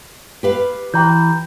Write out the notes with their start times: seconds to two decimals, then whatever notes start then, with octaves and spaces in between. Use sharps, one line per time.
0.43 G4 B4 F5
0.94 E3 G5 A#5 G6